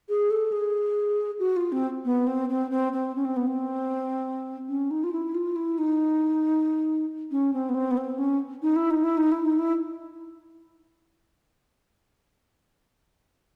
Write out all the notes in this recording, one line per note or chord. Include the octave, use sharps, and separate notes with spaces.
G#4
A4
G#4
F#4
F4
C4
B3
C4
C4
C4
C4
C#4
C4
B3
C4
C#4
D#4
F4
E4
F4
E4
D#4
C#4
C4
B3
C4
B3
C4
C#4
D#4
E4
D#4
E4
D#4
E4
D#4
E4